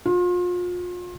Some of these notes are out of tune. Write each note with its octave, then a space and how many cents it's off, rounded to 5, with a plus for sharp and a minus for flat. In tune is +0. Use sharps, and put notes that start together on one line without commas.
F4 +35